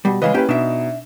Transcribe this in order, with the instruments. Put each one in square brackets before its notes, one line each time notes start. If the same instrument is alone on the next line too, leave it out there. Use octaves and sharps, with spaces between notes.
[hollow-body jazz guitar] B2 G3
[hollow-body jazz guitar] C#3 E3 G#3 [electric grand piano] B4 D#5 F5
[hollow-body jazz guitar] A#3 G4 G5 [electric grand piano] C#4 E4 B4
[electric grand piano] B2 D#4 E7 [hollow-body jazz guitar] D4 E5